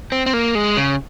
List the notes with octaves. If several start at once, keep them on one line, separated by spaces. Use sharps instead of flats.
C4
C4
A#3
G#3
C#3